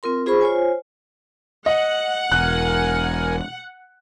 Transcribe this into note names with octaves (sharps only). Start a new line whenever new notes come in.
C4 F4 A#4 C6
F4 G#4 C5 B5 C#6
F4 C5 C#5 G#5
D#5 F#5
E1 A#4 G#5 F#6